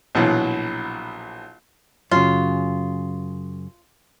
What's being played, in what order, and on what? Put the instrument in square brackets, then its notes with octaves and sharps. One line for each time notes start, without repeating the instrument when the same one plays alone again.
[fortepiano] A#1 B2 E3 F#3
[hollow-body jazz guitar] F#2 C#3 [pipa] F4